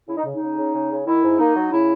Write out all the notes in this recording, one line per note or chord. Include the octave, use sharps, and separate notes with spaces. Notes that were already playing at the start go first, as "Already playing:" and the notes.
C#3 E4
D#4
C#3
D#4
C#3
C#3
C#3
C#3
D#3 E4
G#2
A#3 D#4
F#3
C#3 E4